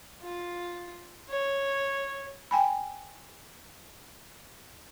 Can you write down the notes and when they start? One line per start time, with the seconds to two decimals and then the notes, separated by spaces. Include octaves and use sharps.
0.22 F4
1.29 C#5
2.51 G5 G#5 B5